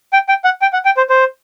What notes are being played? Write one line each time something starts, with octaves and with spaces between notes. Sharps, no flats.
G5
G5
F#5
G5
F#5
G5
C5
C5